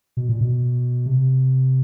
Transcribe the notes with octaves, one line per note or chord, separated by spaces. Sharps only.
B2
A#2
B2
C3